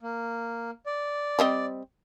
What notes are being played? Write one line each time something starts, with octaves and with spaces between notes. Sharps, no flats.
A#3
D5
G3 C4 D#5